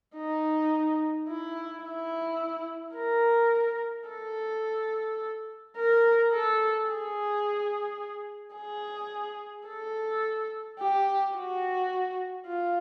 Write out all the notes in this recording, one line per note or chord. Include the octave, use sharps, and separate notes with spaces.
D#4
E4
E4
A#4
A4
A#4
A4
G#4
G#4
A4
G4
F#4
F4